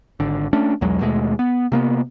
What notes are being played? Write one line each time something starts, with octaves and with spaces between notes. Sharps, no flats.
G#1 D3
A3 C#4 D4
B1 E2 F#3 G#3
D#2 B2 G#3 A3
B3
C3 A#3 B3